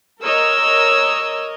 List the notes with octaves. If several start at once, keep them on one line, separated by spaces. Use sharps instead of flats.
A#4 C#5 D#5 E6